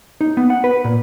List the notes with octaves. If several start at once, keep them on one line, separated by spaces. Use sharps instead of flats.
D#4
B3
F#5
B4
A#2